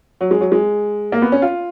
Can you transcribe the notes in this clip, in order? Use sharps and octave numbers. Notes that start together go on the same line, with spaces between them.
F#3
G#3
F#3
G#3
A#3
B3
C#4
F4